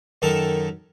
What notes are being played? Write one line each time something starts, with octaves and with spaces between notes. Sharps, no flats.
F#2 D#3 A4 A#4 A5